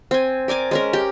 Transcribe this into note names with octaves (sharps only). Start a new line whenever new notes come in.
C4 G#5
A#4 D5 G#5 D6
G#3 C#4 A#4
G4